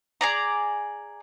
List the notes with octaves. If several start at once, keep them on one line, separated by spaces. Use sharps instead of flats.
G#4 D5 A#5